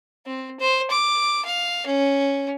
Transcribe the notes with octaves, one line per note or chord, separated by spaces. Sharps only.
C4
C5
D6
F5
C#4